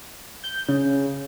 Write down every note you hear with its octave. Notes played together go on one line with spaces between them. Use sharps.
G6
C#3